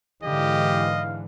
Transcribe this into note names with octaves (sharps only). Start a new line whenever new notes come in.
G#2 D3 E3 G4 D#5 F5